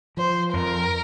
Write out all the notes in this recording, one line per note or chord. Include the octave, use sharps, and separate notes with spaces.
F3 C5
F2 A#4